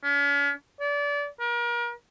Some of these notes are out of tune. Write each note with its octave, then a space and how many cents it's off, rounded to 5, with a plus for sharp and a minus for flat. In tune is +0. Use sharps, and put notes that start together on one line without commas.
C#4 +40
D5 -30
A#4 +35